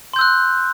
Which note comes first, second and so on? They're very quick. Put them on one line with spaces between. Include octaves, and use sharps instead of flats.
C6 G6 E6 F#6